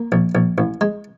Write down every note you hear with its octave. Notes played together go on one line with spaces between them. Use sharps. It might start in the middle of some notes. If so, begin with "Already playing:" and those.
Already playing: A#3
A#1
A#1
A1
G#3